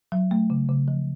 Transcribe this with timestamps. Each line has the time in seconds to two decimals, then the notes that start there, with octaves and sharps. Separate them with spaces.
0.12 F#3
0.31 A3
0.50 C#3
0.69 C#3
0.88 F3